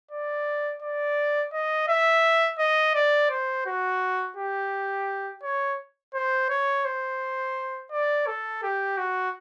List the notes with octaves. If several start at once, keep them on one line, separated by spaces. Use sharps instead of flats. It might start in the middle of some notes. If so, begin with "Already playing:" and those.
D5
D5
D#5
E5
D#5
D5
C5
F#4
G4
C#5
C5
C#5
C5
D5
A4
G4
F#4